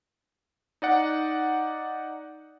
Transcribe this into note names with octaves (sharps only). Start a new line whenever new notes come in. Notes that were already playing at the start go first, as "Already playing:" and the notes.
D#4 D5 F#5